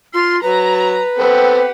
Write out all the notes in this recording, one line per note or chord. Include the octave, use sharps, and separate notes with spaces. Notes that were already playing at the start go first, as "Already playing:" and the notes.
F4 C6 F6
F#3 B4 A#5
B3 C4 G4 A4 F#5